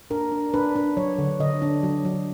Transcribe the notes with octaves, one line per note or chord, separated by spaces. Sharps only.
D4 A#4
D4
D4 B4
D4
F#3 C#5
D3
D3 D#5
D4
F#3
F#3